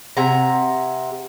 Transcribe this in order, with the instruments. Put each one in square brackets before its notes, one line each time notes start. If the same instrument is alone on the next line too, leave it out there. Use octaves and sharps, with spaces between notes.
[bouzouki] C3 F#5 G#5 A#5